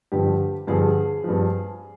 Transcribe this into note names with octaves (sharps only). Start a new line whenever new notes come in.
G2 D3 F3 G4
G2 D3 F3 G#4
G2 F3